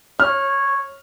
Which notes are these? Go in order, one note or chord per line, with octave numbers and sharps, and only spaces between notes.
C#5 F6